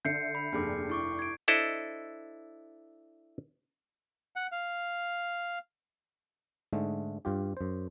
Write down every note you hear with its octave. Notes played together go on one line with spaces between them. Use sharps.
D3 E5 G6 C7 C#7
B5
F1 G2 A#3 G#4 D6
E4 C#6 D6
G#6 D7
D4 E4 A4 C5 D#5
F#5
F5
G#2 D3 G#3 A3
G2 F4 G4
F#2 C5